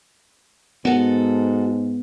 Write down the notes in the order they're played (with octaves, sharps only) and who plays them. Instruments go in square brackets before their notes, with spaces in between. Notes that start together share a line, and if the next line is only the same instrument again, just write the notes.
[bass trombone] G#2 [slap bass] B3 [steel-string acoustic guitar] F#4 A4